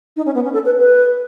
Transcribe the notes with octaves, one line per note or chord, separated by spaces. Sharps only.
D#4
C#4
B3
C#4
A4
B4
B4